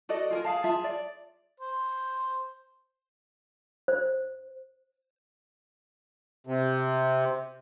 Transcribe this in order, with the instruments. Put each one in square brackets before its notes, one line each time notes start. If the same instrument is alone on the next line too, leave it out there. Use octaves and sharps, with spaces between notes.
[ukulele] F#4 A4 D5 D#5
F4 G#4 A#4
G#4 F5 A5
F4 G#4 E5 A5
D5
[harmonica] C5
[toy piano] C5
[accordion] C3